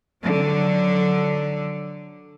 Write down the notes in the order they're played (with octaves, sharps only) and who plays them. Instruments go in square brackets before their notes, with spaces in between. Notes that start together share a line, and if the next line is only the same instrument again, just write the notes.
[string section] D3 F#3